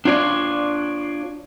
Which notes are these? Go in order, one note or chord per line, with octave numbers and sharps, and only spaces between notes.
D4 F4 C#5 D5